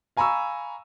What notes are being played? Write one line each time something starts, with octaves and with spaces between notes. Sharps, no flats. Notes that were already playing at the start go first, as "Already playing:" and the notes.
F5 G#5 A#5 B5 C#6 E6